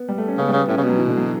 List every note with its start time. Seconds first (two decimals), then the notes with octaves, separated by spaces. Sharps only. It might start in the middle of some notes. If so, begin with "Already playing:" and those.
Already playing: B3
0.08 G3
0.18 A3
0.28 C#4
0.38 C#3 B3
0.48 C#3 G3
0.58 B3
0.68 A2 C#4
0.78 C#3 B3
0.83 B2 F#3
0.98 E3
1.08 D3
1.17 F#3